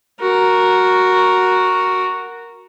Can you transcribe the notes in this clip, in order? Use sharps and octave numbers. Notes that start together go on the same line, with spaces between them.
F#4 A#4